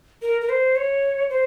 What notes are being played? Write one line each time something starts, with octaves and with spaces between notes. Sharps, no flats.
A#4
A#4
C5
C#5
C5